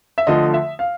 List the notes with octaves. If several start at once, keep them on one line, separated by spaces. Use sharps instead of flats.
E5
D3 F3 A3 D#5
E5
F5